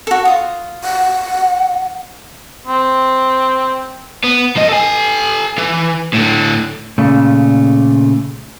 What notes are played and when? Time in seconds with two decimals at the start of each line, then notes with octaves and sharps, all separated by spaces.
0.07 F#4 A4
0.25 F4 D#6
0.84 F#5
2.67 C4
4.24 B3
4.57 F3 D#5
4.69 A4 G#5
5.58 E3
6.14 A2 D3
6.98 A#2 C#3 A3